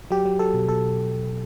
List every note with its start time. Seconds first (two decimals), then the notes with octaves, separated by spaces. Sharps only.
0.11 F#3 G4
0.26 F#3
0.39 F#3 A4
0.54 B2
0.68 B2 A4